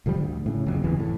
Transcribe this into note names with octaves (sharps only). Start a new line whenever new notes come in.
D#1 D3 F3 G3
D2
A2 C#3
F#1 F2
F#1 E2 E3
A2